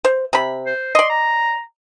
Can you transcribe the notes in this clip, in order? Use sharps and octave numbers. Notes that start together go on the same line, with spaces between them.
C5
C3 B5
C5
D5 D#5 C6
A#5